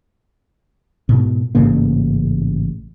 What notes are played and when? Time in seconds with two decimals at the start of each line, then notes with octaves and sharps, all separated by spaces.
1.09 G#2 B2
1.55 A1 G#2 C#3 A#3